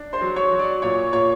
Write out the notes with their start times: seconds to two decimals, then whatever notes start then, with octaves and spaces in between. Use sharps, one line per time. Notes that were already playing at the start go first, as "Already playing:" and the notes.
Already playing: D4
0.13 C5 C6
0.21 F#3
0.36 C#5 C#6
0.51 F#3
0.59 D5 D6
0.82 A#2 C#5 C#6
1.13 A#2 C#5 C#6